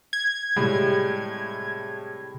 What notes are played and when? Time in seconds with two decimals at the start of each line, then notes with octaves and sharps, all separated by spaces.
0.13 G#6
0.56 A2 C3 G3 G#3